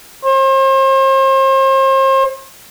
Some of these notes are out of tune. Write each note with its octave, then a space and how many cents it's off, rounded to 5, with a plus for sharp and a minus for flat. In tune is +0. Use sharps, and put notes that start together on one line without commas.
C5 +40